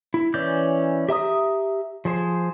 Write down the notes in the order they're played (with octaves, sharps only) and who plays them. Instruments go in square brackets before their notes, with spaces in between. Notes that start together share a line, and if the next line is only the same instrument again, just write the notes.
[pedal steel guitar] E4
E3 C#4 D5 G6
G4 E5 A#5 D#6
F3 G#4 C5